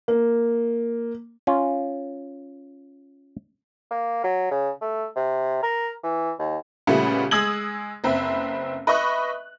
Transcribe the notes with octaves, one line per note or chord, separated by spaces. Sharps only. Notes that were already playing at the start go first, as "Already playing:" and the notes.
A#3
C#4 F4
A#3
F#3
C#3
A3
C3
A#4
E3
D#2
A#2 C#3 G3 A3 B3
G#3 D#6 E6 G#6 F#7
F#1 C4 B4 E5
B4 D#5 E5 C#6 D#6 F#6